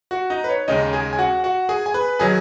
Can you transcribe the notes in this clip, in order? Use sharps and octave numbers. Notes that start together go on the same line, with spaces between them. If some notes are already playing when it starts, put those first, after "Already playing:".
F#4 F#5
D#4 D#5
B4
C#5
D#2 C#3 G#3 D#4 D#5
G#4 G#5
G#5
F#4 F#5
F#4 F#5
G#4 G#5
G#5
B4 B5
D#3 F#3 G#4 G#5